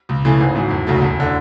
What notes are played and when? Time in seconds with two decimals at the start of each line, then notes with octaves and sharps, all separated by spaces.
0.09 C#2
0.25 C#3 E3 A3
0.40 G#1
0.55 G#2 F#3
0.71 E1
0.87 D2 C#3 F#3 A3
1.02 E1
1.20 D3